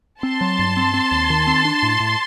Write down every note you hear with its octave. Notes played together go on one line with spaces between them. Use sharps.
C4 A5 C6
F#3
G2
C4
C4
D#2
D#3
C4
D4
A2
A2